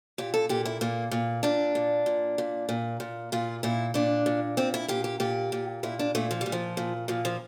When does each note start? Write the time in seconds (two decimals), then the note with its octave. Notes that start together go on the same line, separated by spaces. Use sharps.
0.18 A#2 G4
0.34 A4
0.49 A#2 G4
0.65 E4
0.81 A#2 A#3
1.11 A#2
1.43 A#2 D4
1.75 A#2
2.06 A#2
2.38 A#2
2.69 A#2
3.00 A#2
3.32 A#2 F4
3.63 A#2 E4
3.94 A#2 D4
4.26 A#2
4.57 A#2 C4
4.74 E4
4.88 A#2 G4
5.04 G4
5.20 A#2 G4
5.52 A#2
5.83 A#2 E4
5.99 D4
6.15 A#2 A3
6.31 F3
6.41 A#2 G3
6.52 F3
6.77 A#2
7.08 A#2 F3
7.25 F3